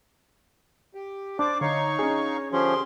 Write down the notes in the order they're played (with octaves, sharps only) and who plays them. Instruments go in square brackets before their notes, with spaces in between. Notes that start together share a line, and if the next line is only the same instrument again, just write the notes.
[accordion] G4
[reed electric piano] D4 [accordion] C5 D5 [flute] D6
[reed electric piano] D3 [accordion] D#4 F5 C#6 [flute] C#5
[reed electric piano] C#4 D4 G#4
[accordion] D3 G4 G#4 [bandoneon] F3 C#4 [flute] C6